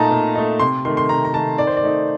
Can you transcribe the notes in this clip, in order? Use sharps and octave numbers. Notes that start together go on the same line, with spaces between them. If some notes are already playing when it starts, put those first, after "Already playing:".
Already playing: A#2 A3 D#4 A5 A#5
A#2
A3 D#4
C3 C6
D#3 A3 C6
C6
C3 A#5
A#5
D#3 A3 A5
D#3 D5
C5
D5
A3 D#4